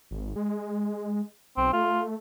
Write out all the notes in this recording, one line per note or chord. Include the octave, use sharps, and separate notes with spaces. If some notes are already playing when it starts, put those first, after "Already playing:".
G#1
G#3
B1 C4
A3 F4